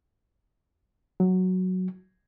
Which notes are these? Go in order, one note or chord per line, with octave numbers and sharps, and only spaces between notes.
F#3